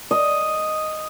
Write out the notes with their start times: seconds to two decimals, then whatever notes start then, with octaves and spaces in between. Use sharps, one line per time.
0.11 D#5